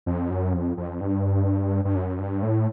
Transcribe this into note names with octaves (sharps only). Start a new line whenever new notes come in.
F2
F#2
F2
F2
G2
G2
F#2
G2
A2